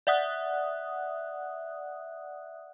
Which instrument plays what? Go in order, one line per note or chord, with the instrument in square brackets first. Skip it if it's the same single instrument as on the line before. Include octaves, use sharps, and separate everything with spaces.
[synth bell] D5 E5 F#5 D#6 F#6